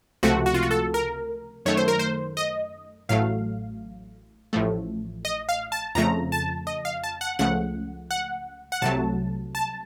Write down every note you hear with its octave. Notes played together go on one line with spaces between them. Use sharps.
C#2 C3 F3 A3 F#4
F#4
F4
F#4
A4
A#4
F#2 D#3 A3 C#5
C5
A#4
C5
D#5
A1 A2 F#3 A3 F5
A1 A2 F3 A3
D#5
F5
A5
F2 C#3 F3 A3 A#5
A5
D#5
F5
A5
F#5
C#2 C#3 F3 A3 F#5
F#5
F#5
C2 C3 F#3 A3 A5
A5